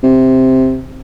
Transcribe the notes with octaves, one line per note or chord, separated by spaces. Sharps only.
C3